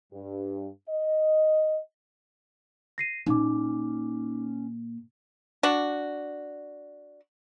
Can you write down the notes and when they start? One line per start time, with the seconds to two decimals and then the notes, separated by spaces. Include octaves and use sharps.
0.13 G2
0.89 D#5
2.98 A#6 C7 D#7
3.26 A#2 C#4 D#4 D6
5.63 D4 F#4